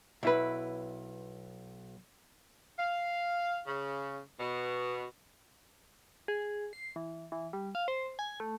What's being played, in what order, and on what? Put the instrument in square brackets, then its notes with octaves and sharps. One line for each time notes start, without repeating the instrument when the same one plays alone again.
[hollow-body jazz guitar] B1 E4 B4
[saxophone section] F5
C#3
B2
[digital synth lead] G#4
C7
E3
E3
G3
F5
C5
G#5
A3